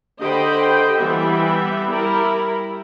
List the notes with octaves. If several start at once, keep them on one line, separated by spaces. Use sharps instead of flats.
D3 G4 C5 D#5 G5 B5
E3 G3 B3 G4 E5
G3 E4 A#4 A#5